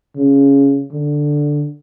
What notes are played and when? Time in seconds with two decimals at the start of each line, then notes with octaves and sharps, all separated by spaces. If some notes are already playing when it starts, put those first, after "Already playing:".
0.17 C#3
0.93 D3